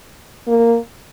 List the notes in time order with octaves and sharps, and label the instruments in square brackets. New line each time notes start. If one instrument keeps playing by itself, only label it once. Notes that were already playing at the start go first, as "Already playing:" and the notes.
[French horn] A#3